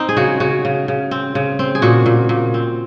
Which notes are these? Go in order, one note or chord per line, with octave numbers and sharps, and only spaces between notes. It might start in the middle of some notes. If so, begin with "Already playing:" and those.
Already playing: C4 D#4
G#4
C#3 F#4
C#3 F#4
C#3
C#3
C4
C#3
C4
G#4
A#2 F#4
A#2
A#2
C4